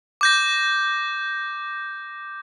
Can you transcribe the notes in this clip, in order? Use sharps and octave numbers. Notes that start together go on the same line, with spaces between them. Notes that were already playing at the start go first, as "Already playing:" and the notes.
D6 G6 A#6